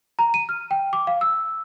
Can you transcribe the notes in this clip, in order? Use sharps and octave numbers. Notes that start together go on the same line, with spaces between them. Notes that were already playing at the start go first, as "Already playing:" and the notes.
A#5
D#7
F6
G5
D6
F5
E6